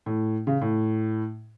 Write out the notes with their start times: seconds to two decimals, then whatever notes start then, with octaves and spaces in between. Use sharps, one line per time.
0.06 A2
0.47 C#3
0.61 A2